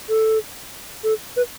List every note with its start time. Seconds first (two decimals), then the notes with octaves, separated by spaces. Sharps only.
0.09 A4
1.04 A4
1.37 B4